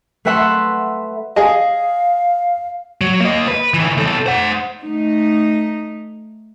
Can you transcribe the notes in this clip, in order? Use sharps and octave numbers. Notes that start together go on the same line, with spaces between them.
A3 B4 E5 F#5 C6
G#4 D#5 F5
F#3
A#3 D#5
B4
D#3 E3
B2 A4
C5 F#5
A3 D#4